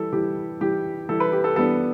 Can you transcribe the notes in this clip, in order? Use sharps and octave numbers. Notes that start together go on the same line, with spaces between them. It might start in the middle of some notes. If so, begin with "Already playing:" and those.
Already playing: E3 G3 E4 A4
E3 G3 E4 G4
E3 G3 E4 G4
E3 G3 E4 A4
B4
G4
A4
E3 G3 B3 D4 A4